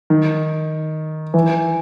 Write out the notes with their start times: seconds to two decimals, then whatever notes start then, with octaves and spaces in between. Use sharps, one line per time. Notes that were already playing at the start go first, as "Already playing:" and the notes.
0.10 D#3
1.34 E3